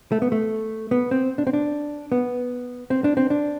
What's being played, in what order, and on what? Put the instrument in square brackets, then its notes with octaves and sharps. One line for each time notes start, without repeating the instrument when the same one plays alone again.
[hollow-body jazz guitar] A3
B3
A3
B3
C4
D4
C4
D4
B3
C4
D4
C4
D4